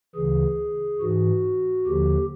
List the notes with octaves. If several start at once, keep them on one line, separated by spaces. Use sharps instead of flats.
D2 C#3 E3 G#4
G#2 E3 F#4
D#2 D3 F3 G4